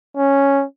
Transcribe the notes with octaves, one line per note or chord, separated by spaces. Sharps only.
C#4